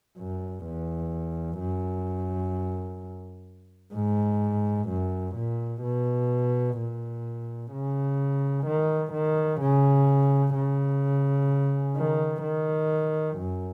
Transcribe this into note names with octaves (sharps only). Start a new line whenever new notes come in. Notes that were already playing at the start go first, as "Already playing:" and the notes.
F#2
E2
F#2
G#2
F#2
A#2
B2
A#2
C#3
D#3
D#3
C#3
C#3
D#3
D#3
F#2